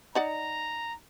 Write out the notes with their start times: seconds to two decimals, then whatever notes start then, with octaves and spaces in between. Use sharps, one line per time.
0.15 D#4 D5 F#5 A#5